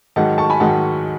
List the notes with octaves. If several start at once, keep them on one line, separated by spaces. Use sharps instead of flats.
G#2 D#3 F#3 F#5 A5
A5 C#6
G#5 B5
G#2 D#3 F#3 F#5 A5